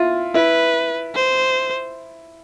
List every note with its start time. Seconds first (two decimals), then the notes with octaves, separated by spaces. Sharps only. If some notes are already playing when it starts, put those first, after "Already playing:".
Already playing: E4 F4
0.34 E4 B4
1.15 C5